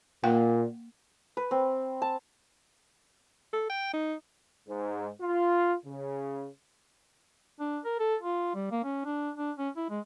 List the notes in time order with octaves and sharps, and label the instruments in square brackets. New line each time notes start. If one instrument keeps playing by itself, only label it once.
[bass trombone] A#2 [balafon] A#3 F5 G5
[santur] B4
C4
A5
[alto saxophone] A4
G5
D#4
[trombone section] G#2
F4
C#3
[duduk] D4
A#4
A4
F4
G3
A#3
C#4
D4
D4
C#4
E4
G#3